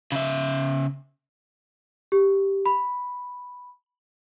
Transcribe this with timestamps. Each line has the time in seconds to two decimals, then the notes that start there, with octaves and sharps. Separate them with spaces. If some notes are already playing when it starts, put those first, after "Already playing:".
0.12 C#3 E5
2.12 G4
2.66 B5